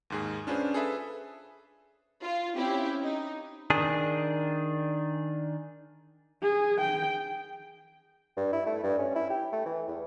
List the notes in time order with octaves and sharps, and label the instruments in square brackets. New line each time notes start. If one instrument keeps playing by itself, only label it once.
[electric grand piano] D#2 G#2 G#4
C#4 D4 F4 G#4 B4 C5
G#4 A4 B4 E5
[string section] F4
C4 C#4 E4 G4
D#4
[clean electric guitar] D#3 D4 G#4
[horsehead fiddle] G#4
G5
[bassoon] G2
E4
A3
G2
C#4
E4
G4
A3
E3
E2